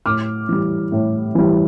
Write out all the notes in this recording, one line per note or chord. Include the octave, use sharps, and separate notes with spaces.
A2 D6 F6
E3 G3
A2
E3 G3